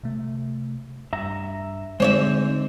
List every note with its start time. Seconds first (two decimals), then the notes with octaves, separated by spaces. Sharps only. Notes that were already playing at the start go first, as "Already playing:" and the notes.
0.03 C3 A3
1.13 G2 E5 A#5
2.00 D3 G#3 C4 D#4 C5 C#5 E5